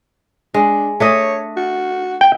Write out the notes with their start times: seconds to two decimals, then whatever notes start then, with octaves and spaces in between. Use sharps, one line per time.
0.54 G#3 D4
1.00 A3 D4 C#5 D#5
1.57 F#4
2.21 G5